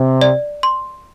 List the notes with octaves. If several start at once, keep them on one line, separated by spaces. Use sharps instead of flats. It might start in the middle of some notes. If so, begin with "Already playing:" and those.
Already playing: C3
D5
C6